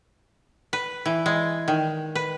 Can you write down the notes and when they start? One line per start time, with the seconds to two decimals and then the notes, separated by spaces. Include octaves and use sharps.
0.73 B4
1.06 E3
1.26 G#3
1.68 D#3
2.15 B4